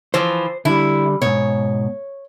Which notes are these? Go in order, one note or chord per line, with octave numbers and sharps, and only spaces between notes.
E3 F3 C5
D3 G3 E4
G#2 B2 C#5